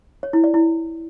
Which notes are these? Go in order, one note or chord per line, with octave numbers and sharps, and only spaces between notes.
C#5
E4
D5
E4